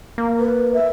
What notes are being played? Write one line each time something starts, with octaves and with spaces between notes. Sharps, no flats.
A#3
B4
E5